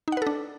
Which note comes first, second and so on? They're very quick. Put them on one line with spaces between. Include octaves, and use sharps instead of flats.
D#4 F#5 B4 A4 D4